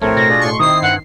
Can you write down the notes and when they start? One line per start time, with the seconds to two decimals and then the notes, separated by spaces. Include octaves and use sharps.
0.02 A#1 A2 A3 C4 A#4 C#5
0.17 B2 A#6
0.29 D4 F4 G#4
0.41 A2 C6 C#6
0.59 D#3 C4 E4 D#6 C7
0.83 G2 F#5